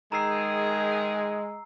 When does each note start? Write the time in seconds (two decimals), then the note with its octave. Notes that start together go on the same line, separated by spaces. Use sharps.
0.12 D#3 G#3 G#4 A#5 E6 C7